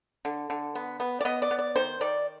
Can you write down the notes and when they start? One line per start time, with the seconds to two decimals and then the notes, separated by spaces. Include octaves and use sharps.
0.25 D3
0.50 D3
0.75 B3
1.00 B3
1.21 D5
1.25 B3 D#5
1.42 D5
1.51 B3
1.59 D5
1.76 D#3 C5
2.01 D#3 D5